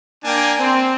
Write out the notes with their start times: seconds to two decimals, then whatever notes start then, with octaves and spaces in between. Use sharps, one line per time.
0.24 A#3 D4 G5 G#5
0.60 C4